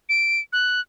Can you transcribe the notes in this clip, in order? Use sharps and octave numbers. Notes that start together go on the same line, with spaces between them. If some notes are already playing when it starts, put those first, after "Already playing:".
D7
F#6